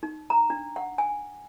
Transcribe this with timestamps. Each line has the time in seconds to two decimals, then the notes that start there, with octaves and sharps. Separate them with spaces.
0.03 D#4
0.30 A#5
0.50 D4
0.76 F#5
0.98 G#5